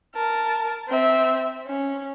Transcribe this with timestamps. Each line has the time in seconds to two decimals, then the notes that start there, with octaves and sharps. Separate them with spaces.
0.15 A#4 A5
0.89 C4 E5
1.66 C#4